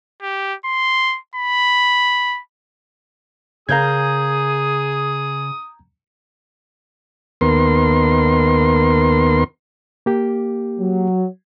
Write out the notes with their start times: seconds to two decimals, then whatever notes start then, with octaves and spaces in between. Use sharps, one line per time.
0.22 G4
0.65 C6
1.35 B5
3.69 C#3 G#4 A#4 F5 A#5 D#6 G6 G#6
7.41 D#2 B3 A#4 C6
10.06 A#3 G4
10.79 F#3